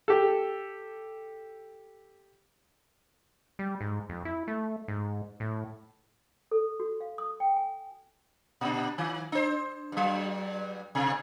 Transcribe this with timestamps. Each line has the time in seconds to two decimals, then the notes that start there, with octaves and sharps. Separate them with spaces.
0.08 G4 A4
3.59 G3
3.81 G#2
4.09 F2
4.25 E4
4.48 A3
4.88 G#2
5.40 A2
6.51 A4
6.80 F#4
7.01 F5
7.18 D#6
7.40 G5
7.57 G#5
8.61 A#2 D4
8.98 D#3
9.32 D4 C5
9.92 G2 F#3
10.95 B2